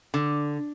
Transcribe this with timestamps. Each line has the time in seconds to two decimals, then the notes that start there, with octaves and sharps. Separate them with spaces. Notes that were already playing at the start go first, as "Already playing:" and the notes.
0.14 D3